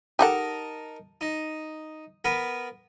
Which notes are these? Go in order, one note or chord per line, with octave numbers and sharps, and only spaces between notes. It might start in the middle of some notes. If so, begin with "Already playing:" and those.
D#4 G4 A4 A#4 F#5 A5
D#4
B3 A#4 B4